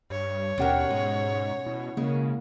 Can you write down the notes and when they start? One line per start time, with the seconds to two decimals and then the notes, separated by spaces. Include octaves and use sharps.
0.10 G2 C#5
0.58 D#2 B2 C#4 D4 G4 A#4 F#5
0.90 G#2 G#3
1.66 B2 E4
1.97 C#3 G#3 A#3